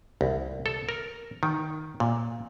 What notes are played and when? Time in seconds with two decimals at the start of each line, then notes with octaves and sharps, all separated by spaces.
0.21 C2
0.66 A4
0.89 A#4
1.43 D#3
2.00 A#2